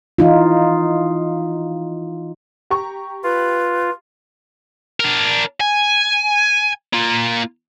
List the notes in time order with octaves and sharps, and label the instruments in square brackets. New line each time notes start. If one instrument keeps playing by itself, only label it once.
[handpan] E3 D#4 F4
[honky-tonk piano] G4 A#5 C#6
[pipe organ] F4 [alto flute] B4
[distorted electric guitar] D4 A#4
G#5
A#3 F4